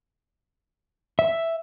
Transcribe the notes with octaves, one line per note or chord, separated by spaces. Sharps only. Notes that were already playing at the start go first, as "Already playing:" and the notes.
E5